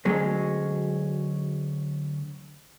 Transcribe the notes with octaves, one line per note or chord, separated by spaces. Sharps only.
D2 F#3 G#3 C#4